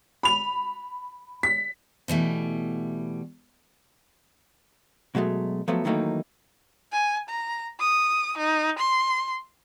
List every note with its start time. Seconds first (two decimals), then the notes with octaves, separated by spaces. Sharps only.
0.23 B5 F7
1.43 B6
2.08 B2 E3 G3 A3
5.15 B2 F#3 G#3 A3
5.68 F3 F#3 A3 B3
5.85 D#3 E3 F#3 A3 A#3 D#4
6.92 G#5
7.29 A#5
7.79 D#6
8.38 D#4
8.78 C6